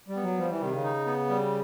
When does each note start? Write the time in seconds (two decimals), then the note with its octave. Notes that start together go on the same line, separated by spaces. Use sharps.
0.08 G3
0.16 B3
0.23 F#3
0.38 F3 G3
0.50 E3
0.61 C3 D#3
0.72 C#3
0.83 D#4
1.06 B3
1.29 G3